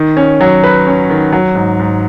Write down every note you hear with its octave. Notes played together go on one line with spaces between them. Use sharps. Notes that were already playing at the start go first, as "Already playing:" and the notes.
Already playing: D#3
C#4
F#3
B4
C#4
D#3
F#3
G#2
G#2